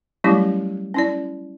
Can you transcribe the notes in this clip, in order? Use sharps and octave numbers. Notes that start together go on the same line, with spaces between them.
F#3 G3 A3 C#4 E4 G4
C#4 E4 D5